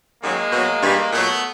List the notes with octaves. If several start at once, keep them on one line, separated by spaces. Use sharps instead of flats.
F#2 D#3 F#3 G#3 A#3
B2 F#3
G2 E3
A#2 F#3 A3 B3